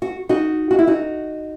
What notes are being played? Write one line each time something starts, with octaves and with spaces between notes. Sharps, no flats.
F#4
D#4 F#4
F#4
E4
D#4 F#4